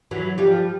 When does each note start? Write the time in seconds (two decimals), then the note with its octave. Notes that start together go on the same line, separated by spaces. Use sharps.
0.11 E3 F#3
0.38 F3 G3